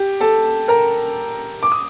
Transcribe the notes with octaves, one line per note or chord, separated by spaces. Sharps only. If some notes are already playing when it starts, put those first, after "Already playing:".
Already playing: G4
A4 A5
A#4 A#5
D6
D#6